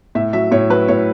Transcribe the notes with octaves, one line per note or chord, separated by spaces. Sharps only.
A2 E5
F#3 E5
A2 C#5
F#3 B4
A2 C#5